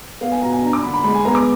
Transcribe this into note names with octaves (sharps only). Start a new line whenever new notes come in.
B3 F5
G#5
B2 A#5
G#5
D4 A#5
D6
D3 B5
B5
G#3 B5
G#5
B3 A#5
D6